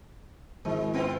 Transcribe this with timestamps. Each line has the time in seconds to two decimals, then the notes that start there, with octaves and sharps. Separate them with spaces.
0.65 G#1 G#3 E4 C5
0.94 B3 C4 F4